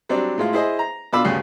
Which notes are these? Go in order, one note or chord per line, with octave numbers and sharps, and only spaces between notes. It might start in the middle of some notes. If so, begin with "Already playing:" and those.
F#3 G3 C4 D4
A2 G#3 F4
E4 G#4 C5 D#5
A#5
B2 D4 F4 B5 D6 E6
D2 G2 C#3